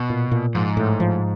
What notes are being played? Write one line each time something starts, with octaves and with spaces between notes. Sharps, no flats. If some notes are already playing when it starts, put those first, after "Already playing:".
Already playing: B2
A#2
A#2
G#2 F3
A2
F3